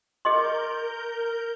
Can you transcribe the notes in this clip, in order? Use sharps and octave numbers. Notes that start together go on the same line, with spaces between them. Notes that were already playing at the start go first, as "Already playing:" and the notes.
G#4 A#4 D#5 C6 G6